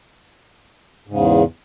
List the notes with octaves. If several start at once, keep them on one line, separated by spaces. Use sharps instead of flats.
E2 G#2 C#3